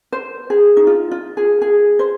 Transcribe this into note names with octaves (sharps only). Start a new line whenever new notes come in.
C5
G#4
D#4
F4
F4
G#4
G#4
C5